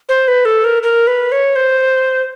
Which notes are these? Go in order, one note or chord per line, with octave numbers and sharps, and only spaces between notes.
C5
B4
A4
A#4
A#4
B4
C#5
C5